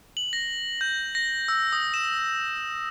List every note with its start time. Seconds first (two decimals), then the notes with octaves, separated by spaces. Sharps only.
0.17 F#7
0.33 A#6
0.81 G6
1.15 A#6
1.48 E6
1.72 D#6
1.94 E7